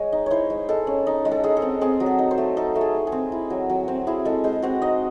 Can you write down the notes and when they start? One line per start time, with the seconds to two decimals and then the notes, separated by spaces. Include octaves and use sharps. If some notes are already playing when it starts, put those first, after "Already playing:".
Already playing: G#3 C#5 D#5
0.12 D#4
0.26 E4 C5 C#5
0.50 G#3
0.69 G#3 A4
0.87 C#4
1.07 D#4
1.25 G#3
1.31 A4
1.44 G#3 G#4
1.57 A4
1.62 C4
1.81 C4 G#4
2.00 F#3
2.06 A4
2.19 D#4
2.31 C5
2.38 A3
2.57 D#4 A4
2.76 A3
2.81 G#4
2.95 A3
3.07 G#4
3.12 C4
3.32 E4
3.50 F#3
3.70 F#3
3.88 C4
4.07 E4 G#4
4.25 G#3 A4
4.44 G#3 C5
4.62 C4 F#4
4.82 D#4 D#5